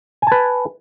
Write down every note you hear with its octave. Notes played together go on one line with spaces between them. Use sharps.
B4 G#5 A5